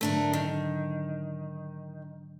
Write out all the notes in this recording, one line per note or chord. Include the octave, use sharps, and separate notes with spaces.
G#2 D3 F#3 A3 D4 A#4
D#3